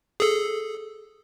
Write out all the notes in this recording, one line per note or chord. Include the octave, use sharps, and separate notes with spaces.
G#4 A4